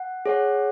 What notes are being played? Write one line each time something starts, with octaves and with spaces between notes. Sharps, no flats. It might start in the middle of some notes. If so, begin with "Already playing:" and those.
Already playing: F#5
G#4 C#5 F#5